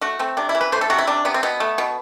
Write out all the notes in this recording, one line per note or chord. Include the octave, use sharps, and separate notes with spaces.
A3 F#4
A3 C4
C3 D4
E4
E3
B4
A3 C5
A4
C3 F#4
E4
C3 D4
C3 B3
C4
B2 B3
A3
B2